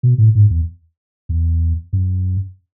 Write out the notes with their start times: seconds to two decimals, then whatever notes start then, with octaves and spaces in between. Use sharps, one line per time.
0.03 B2
0.18 A2
0.35 G#2
0.50 E2
1.29 E2
1.93 F#2